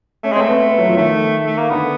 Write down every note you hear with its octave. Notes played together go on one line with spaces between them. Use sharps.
A3 C#4
G#3 C4
A3
B3
B3
F#3
F3
D#3 A3
A3
A#3
D3 B3